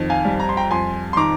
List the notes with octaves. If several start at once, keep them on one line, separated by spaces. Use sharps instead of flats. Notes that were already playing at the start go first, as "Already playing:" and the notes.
Already playing: F2 D#3
F5 G#5
G3
A#5
C6
G5 A#5
F2 G#5 C6
C6
D#3 A#5 D6